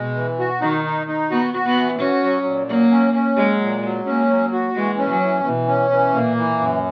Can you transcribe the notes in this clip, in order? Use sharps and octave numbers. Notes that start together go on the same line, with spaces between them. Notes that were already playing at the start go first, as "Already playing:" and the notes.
Already playing: B2 G#3
E3
F#4
D#3 D#4
D#4
D#4
B3 F#4
F#4
B3
E3
C#4 F#4
F#3
A#2
F#3 A#3
C#4
C#4
F#3 G#3
A#2
F#3
A#3 C#4
F#3
F#4
E3 G#3
C#4
F#3
E3
B2 E3
C#4
E3
A#2 A#3
E3
F#2